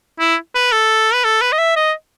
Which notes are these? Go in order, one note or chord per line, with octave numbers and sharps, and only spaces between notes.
E4
B4
A4
B4
A4
B4
D#5
E5
D#5